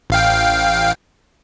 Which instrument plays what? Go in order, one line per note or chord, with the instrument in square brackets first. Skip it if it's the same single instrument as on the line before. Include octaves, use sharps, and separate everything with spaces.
[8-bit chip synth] A1 F5 G5